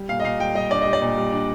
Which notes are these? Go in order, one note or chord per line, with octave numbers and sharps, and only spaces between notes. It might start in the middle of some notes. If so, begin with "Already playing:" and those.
Already playing: G3
A#2 F5
D#5
A#2 F5
G3 G5
G3 D#5
D4 D5
G3 D#5
D5
A#2
G3
D4